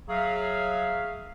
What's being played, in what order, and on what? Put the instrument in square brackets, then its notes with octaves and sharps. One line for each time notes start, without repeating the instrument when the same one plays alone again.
[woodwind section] F#3 G#4 E5 F5